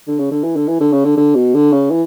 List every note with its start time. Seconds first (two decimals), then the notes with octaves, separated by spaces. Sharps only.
0.07 D3
0.19 C#3
0.32 D3
0.44 E3
0.56 D3
0.68 E3
0.81 D3
0.93 C#3
1.05 D3
1.17 D3
1.35 B2
1.54 D3
1.73 C#3
1.91 E3